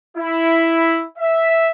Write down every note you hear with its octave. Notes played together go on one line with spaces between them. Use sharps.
E4
E5